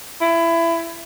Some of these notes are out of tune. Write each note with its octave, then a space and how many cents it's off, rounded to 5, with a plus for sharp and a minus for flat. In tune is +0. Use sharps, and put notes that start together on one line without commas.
E4 +20